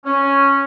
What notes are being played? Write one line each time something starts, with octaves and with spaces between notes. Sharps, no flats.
C#4